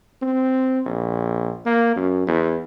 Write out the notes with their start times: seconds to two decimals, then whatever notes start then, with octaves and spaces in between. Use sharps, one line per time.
0.22 C4
0.85 A#1
1.66 A#3
1.96 F#2
2.27 E2